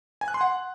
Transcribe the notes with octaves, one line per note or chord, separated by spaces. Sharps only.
G#5
F#6
C6
F#5